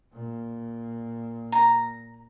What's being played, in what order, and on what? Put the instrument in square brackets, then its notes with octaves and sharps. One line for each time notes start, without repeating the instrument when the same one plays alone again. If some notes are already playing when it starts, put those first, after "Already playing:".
[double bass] A#2
[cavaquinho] A#5